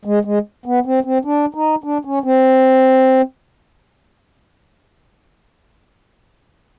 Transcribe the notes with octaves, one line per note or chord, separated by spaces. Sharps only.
G#3
G#3
B3
C4
C4
D4
D#4
D4
C#4
C4